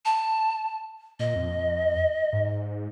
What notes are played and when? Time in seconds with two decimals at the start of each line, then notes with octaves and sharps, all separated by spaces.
0.05 A5
1.19 A#2 D#5
1.36 F2
2.33 G#2